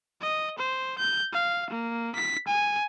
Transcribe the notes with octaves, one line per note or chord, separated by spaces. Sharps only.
D#5
C5
G6
F5
A#3
B6
G#5